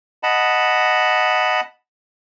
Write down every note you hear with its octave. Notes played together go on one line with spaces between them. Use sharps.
D#5 F#5 A5 B5